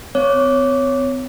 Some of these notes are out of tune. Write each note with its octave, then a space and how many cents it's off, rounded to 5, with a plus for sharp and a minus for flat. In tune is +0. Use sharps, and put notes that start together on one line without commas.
C4 -45 C#5 +0 D6 -15